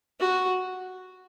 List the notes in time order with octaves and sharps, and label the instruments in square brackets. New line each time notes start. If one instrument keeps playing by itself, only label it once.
[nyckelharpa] F#4